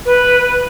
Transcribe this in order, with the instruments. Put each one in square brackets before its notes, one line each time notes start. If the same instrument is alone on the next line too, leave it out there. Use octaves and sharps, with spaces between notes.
[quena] B4